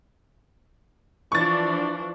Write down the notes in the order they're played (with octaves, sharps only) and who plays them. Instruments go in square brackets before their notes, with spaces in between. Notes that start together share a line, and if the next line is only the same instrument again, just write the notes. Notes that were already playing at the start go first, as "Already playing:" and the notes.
[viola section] E3 F3 D4 [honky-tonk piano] C#6 A6